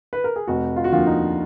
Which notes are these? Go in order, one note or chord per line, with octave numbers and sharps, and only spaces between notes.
B4
A#4
G#4
F1 F#4
F4
F#4
D#2 D3 F3 F4
D#4